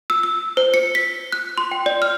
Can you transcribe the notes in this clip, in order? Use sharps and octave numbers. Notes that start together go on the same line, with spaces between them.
E6
E6
C5
C#7
B6
F#6
C6
G5
D5
F6